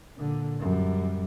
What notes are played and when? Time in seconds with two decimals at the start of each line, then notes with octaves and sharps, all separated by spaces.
0.17 A#2 D3
0.59 F#2 G3